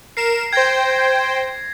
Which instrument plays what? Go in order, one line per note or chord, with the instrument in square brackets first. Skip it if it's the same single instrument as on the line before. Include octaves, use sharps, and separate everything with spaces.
[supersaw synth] A#4 E7 [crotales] C7
[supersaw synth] C5 G5 [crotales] G#6 A#6